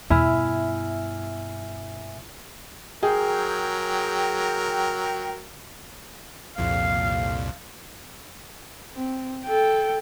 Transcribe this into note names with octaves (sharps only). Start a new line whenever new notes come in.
E2 G2 B2 E4 E5 G#5 F6
F#3 G#4 A#4 G5
C2 F2 A#2 F5
C4
A4 G5